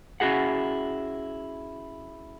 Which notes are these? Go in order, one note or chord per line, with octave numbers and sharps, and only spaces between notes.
C#4 E4 F#4 G#4 F#5